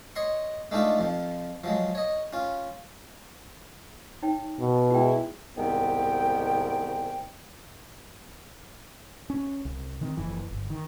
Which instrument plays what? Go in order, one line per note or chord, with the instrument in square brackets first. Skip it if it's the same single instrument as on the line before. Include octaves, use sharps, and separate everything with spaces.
[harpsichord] C#5 D#5 C6 C#6
G#3 A3 D4 D#4 F4 A4
F2 F3
F3 F#3 G#3
C#5 D#5
C#4 F4
[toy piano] D#4 C#5 G5
[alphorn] B2
[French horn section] G#3 E4 [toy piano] F#5 G5
[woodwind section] C2 G#2 D#3 B3 G5
[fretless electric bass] C#4
C2
D#3 B3 C4
F#1 F2 E3
G1
D#3